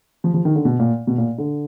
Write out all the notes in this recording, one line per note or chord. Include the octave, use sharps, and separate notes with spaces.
F3
F3
D#3
D3
B2
A#2
B2
A#2
D3